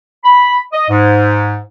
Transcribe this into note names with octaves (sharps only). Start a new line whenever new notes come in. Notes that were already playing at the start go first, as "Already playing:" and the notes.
B5
D#5
G#2